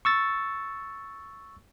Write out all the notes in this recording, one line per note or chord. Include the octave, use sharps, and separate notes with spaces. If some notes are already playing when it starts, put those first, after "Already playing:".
C#6 E6 A6